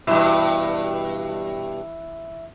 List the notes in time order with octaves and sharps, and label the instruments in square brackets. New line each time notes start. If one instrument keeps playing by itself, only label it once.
[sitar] G2 B2 [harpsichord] E3